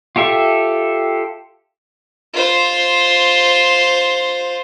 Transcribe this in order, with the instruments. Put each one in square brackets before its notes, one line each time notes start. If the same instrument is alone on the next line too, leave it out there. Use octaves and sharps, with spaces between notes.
[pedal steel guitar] F4 G4 A4 E5
[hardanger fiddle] F4 C5